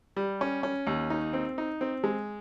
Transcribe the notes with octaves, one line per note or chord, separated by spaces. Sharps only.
G3
C#4
C#4
D#2
D#4
C4
D#4
C4
G#3